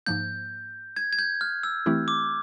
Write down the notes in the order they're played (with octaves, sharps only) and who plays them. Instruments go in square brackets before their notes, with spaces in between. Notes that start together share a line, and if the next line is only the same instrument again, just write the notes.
[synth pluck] G#2 F3 A#3 [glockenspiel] G6
[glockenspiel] G#6
G#6
G6
F6
E6
[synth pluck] E3 A3 C4 E4 G4
[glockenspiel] D6